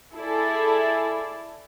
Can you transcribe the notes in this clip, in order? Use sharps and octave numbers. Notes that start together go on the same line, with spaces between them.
E4 G#4 A4 D5